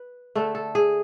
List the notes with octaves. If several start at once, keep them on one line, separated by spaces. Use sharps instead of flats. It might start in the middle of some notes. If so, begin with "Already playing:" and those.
Already playing: B4
D3 A3 A4
A4
G#4